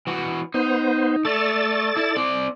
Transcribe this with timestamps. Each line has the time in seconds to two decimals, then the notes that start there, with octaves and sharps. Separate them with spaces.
0.07 E3 F#4
0.54 B3 D#4 C5
1.25 A3 A4 D5 A6
1.97 E4
2.17 C4 D5